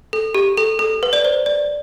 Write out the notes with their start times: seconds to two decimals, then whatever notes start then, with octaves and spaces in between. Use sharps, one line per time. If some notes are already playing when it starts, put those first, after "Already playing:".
0.13 A4
0.35 G4
0.57 A4
0.79 A4
1.03 B4
1.13 D5
1.24 C5
1.46 D5